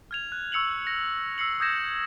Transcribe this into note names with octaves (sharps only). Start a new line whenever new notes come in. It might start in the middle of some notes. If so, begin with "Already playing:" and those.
F6 G#6 F7
F#6
C#6 E6 C#7 F7 F#7
A#6
E6 C7 C#7 F#7
D#6 E6 G6 G#6 A#6 E7